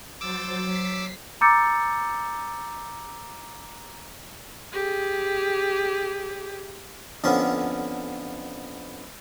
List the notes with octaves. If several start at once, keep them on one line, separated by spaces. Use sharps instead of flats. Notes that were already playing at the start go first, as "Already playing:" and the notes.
F#3 C5 D6 E6 A6
F#3 B6 C7
A#5 D6 E6 G6 A6 C#7
G4 G#4
F2 D3 B3 C#4